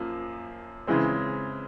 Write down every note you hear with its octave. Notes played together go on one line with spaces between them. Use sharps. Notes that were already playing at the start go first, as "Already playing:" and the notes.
Already playing: F#2 F3 A#3
C#3 E3 G#3 C4